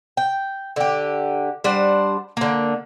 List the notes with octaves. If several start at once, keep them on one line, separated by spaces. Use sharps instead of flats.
G5
D3 G4
G3 D4 C5 F#5
D3 A#3